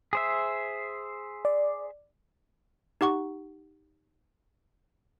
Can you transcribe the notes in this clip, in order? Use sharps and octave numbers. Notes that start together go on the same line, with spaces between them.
G#4 C5 E5
D5
D#4 G4 F#5 C#6